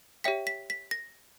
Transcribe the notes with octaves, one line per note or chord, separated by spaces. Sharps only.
G4 C#5 E5 G5 B6
B6
B6
A#6